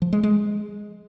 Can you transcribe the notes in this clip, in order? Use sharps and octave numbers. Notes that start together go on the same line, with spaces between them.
F3
G#3
G#3